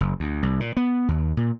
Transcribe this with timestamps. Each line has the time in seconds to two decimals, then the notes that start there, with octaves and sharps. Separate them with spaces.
0.01 F#1
0.20 D2
0.43 C2
0.60 A#2
0.77 B3
1.08 D#2
1.37 A#2